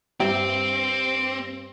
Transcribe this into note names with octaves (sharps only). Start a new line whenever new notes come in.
G2 C4 E4 G4 D6